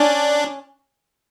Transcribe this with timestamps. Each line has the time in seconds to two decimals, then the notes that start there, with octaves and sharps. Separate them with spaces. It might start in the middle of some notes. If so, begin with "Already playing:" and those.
Already playing: C#4 D4